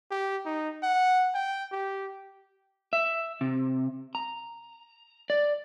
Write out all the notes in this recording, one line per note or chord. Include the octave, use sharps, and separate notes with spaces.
G4
D#4
F#5
G5
G4
E5
C3
A#5
D5